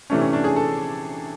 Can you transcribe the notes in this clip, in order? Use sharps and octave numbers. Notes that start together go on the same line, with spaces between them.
C3 E3 A3 C#4 D4
C#4
D4
G#4
A4